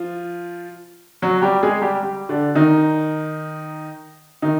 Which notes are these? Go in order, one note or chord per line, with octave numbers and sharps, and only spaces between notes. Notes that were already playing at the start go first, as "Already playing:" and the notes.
Already playing: F3 F4
F#3 F#4
G3 G4
G#3 G#4
G3 G4
G3 G4
D3 D4
D#3 D#4
D#3 D#4